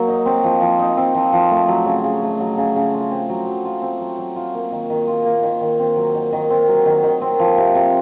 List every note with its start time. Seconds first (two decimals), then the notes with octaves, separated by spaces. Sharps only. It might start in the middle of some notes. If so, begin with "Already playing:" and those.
Already playing: F#3 A#3
0.08 D#4
0.26 C4
0.44 F3
0.61 F3
0.79 D#4
0.97 C4
1.15 F3
1.33 F3
1.51 A3
1.68 F#3
1.86 C#3
2.04 C#3
2.22 A3
2.40 F#3
2.58 C#3
2.76 C#3
2.93 F4
3.11 C4
3.29 F#3
3.47 F#3
3.65 F4
3.82 C4
4.00 F#3
4.18 F#3
4.36 F4
4.54 A#3
4.72 D#3
4.90 D#3
5.07 F4
5.25 A#3
5.43 D#3
5.61 D#3
5.79 C4
5.96 F#3
6.15 D#3
6.32 D#3
6.50 C4
6.68 F#3
6.86 D#3
7.03 D#3
7.21 C4
7.39 F3
7.58 C3
7.75 C3